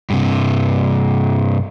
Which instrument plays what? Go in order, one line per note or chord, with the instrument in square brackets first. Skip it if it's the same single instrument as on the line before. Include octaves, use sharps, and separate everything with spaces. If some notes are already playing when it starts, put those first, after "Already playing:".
[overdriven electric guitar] G2 C3